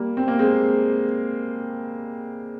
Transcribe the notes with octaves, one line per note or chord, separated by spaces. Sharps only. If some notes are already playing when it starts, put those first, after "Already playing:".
Already playing: G3 A#3
C4
A#3
G#3 C4